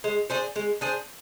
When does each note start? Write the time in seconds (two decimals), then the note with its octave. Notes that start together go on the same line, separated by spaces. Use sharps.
0.04 G#3
0.30 D4 G#4 C5
0.56 G#3
0.81 D4 G#4 C5